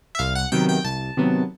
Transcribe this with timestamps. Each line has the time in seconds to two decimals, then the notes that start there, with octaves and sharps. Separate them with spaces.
0.15 E5
0.19 C2 F5
0.35 F#5
0.52 C3 D#3 F#3 B3 G5
0.69 G5
0.85 C2 A5
1.17 C3 D#3 F#3 B3